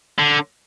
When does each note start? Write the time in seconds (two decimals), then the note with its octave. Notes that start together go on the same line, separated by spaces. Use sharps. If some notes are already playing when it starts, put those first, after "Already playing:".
0.19 D3